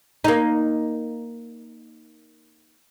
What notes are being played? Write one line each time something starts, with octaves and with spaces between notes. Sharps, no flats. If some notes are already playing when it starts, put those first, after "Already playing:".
A#3 D#4